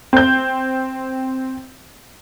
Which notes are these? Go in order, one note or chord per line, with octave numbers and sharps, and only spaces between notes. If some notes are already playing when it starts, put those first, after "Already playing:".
C4 G6